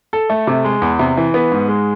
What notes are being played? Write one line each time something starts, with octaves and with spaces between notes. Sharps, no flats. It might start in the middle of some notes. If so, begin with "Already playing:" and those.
A4
A3
C3
G#3
E2
C3
E3
B3
G#2
G#3